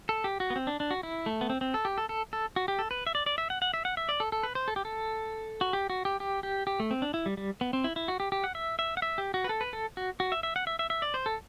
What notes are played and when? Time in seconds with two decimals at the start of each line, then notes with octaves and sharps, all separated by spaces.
0.09 A4
0.24 G4
0.40 F#4
0.50 B3
0.56 C4
0.67 D4
0.80 D4
0.91 F#4
1.03 E4
1.26 A3
1.41 B3
1.50 C4
1.61 C4
1.74 A4
1.85 G4
1.98 A4
2.09 A4
2.33 A4
2.56 F#4
2.68 G4
2.79 A4
2.91 B4
3.07 E5
3.15 D5
3.26 D5
3.38 E5
3.50 F#5
3.62 F#5
3.74 E5
3.85 F#5
3.97 E5
4.09 D5
4.20 A4
4.32 A4
4.43 B4
4.55 C5
4.68 A4
4.76 G4
4.85 A4
5.61 F#4
5.73 G4
5.90 F#4
6.05 G4
6.20 G4
6.43 G4
6.67 G4
6.80 A3
6.91 C4
7.02 D4
7.14 E4
7.26 G3
7.37 G3
7.61 B3
7.73 C4
7.84 E4
7.96 E4
8.08 F#4
8.20 G4
8.32 G4
8.44 F#5
8.55 E5
8.79 E5
8.97 F#5
9.02 E5
9.18 G4
9.34 F#4
9.44 B4
9.49 A4
9.61 B4
9.73 A4
9.97 F#4
10.20 F#4
10.32 E5
10.43 E5
10.56 F#5
10.67 E5
10.79 E5
10.90 E5
11.02 D5
11.14 C5
11.26 A4